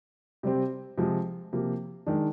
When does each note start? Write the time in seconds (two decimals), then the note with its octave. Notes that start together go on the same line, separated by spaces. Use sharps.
0.43 C3 G3 C4
0.97 C3 F3 G#3
1.53 C3 F3 A#3
2.06 D#3 G#3 D4